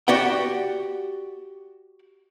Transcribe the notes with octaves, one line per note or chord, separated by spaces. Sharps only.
F#4 G4 D5 F#5 G5